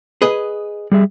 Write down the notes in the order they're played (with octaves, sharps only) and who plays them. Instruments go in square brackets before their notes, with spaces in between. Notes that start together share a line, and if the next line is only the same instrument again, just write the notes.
[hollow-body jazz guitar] G#4 B4 D#5
[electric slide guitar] G3 G#4 E5